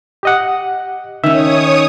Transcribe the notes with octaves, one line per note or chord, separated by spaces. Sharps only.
G4 D#5 F#5
D#3 C#4 C#5 E5 D#6